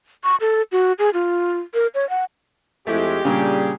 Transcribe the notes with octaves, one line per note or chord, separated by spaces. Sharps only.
C#6
A4
F#4
G#4
F4
A#4
C#5
F#5
F2 G#3 A3 E4 G4
A#2 C#3 G3 D4 G#4